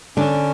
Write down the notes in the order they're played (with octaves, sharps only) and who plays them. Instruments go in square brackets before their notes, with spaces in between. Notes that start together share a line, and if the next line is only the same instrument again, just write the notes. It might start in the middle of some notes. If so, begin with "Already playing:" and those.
[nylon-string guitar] D3 D4 [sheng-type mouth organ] C#4